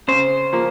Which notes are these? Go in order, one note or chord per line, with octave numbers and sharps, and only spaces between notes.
C#3 C5
F3 A#3